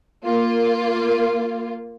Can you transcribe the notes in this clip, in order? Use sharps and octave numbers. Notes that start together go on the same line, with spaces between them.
A#3 F4